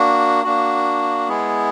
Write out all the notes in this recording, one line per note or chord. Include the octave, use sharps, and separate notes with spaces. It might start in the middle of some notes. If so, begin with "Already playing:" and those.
Already playing: A#3 D4 F#4
A#3 D4 F#4
G#3 B3 E4 G#4